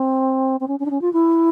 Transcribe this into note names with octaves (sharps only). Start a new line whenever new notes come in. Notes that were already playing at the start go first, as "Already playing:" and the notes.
Already playing: C4
C4
C#4
C#4
D4
C#4
F4
E4